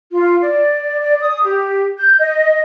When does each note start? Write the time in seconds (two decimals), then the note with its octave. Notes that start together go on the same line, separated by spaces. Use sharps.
0.12 F4
0.41 D5
1.00 D5
1.21 D#6
1.44 G4
1.98 G6
2.18 D#5